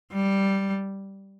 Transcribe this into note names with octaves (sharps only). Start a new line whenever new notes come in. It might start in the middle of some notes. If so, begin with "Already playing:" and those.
G3